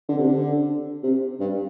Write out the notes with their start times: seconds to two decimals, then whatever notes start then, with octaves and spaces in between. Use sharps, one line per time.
0.09 D3
0.19 C3
0.28 D3
1.03 C3
1.40 G2